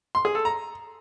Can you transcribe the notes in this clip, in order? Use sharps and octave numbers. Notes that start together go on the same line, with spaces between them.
C6
G#4
A4
A#5